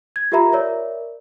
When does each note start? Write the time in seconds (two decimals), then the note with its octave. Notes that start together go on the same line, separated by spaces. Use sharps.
0.16 G#6
0.32 F4 G4 A#4 E5 A#5 B5
0.52 A#4 C#5 D5 E5